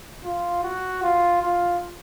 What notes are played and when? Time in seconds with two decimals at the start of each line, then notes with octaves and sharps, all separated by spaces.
0.24 F4
0.64 F#4
1.03 F4
1.42 F4